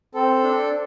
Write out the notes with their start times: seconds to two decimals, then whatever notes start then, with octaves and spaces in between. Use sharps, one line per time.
0.14 C4 A4
0.44 D4